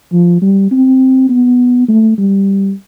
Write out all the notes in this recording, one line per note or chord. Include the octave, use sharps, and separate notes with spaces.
F3
G3
C4
B3
A3
G3